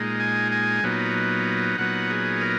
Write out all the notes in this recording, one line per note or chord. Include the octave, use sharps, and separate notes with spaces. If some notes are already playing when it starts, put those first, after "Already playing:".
Already playing: A#2 G#3 D#4
G#5
G#5
A#2 F#3 B3 D#4
A#2 F#3 B3 D#4 F#5
G#4
A#4